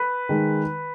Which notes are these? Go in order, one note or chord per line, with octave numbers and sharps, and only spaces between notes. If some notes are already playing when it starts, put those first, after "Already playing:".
Already playing: B4
D#3 G#3